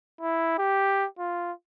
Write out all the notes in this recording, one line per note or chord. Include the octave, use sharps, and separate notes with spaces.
E4
G4
F4